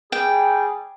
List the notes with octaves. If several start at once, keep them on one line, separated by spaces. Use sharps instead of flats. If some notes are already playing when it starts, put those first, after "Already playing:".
G3 G#4 G5